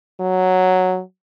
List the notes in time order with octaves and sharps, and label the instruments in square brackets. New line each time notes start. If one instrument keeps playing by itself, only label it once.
[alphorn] F#3